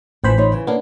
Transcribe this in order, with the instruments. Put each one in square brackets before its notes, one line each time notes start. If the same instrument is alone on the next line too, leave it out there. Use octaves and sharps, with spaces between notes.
[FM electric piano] A1 C5 B5 [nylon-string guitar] A2 E3 F3
[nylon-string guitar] D#4 F4 C#5
C#3 E3
[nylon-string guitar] A#3 C#4 A#4 [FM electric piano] B3 D4